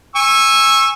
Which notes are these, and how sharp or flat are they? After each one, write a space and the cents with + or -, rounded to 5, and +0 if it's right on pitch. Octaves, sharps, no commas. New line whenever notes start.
G#5 -15 C#6 -20 E6 +0